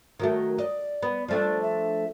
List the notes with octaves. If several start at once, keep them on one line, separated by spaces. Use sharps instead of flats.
D#3 F#3 A3
D5 D#5
B3
F3 A3 D4 D5
E5